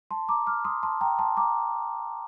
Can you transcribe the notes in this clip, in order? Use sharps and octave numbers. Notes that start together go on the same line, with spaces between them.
A5 C6
A#5 D6
D6 F6
C6 D#6
A5 C6
G5 A#5
A5 C6
A#5 D6